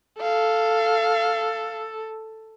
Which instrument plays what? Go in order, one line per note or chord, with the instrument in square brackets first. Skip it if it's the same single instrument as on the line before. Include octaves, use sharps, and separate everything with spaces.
[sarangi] A4 [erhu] F5